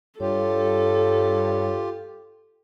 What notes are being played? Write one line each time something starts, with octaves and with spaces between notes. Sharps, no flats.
G2 F4 G4 A4 C#5